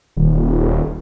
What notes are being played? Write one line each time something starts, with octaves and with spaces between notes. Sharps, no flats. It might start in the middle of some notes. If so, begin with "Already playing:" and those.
D#1